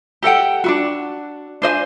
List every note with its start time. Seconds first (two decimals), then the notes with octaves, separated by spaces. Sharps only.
0.23 G4 A4 F#5 G5
0.64 D4 E4 F#4
1.62 D4 C5 D#5 G#5